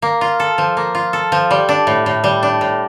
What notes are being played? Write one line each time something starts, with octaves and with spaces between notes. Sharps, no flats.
A#3
F4
A4
F3
A#3
F4
A4
F3
G3
D4
A2
A2
G3
D4
A2